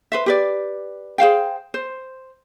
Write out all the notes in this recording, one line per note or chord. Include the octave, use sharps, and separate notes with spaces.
B4 C5 E5
G4 B4 D5
G#4 C5 F5 G5
C5